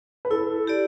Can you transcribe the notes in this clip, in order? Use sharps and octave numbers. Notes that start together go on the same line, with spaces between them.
B4
E4 A4
G4 D5